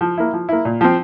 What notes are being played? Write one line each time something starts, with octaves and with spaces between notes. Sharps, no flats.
F3
A#3 E4
F3
A#3 E4
A#2
F3 C4